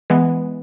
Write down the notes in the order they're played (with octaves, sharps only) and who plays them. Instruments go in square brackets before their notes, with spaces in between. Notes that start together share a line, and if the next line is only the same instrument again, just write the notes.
[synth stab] E3 G#3 B3